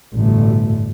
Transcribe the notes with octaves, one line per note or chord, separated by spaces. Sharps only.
A1 D2 G2 B2 A3